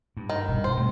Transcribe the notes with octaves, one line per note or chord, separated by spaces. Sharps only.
G2
D#3
B2 G3
B2 C5
C2 C3 A3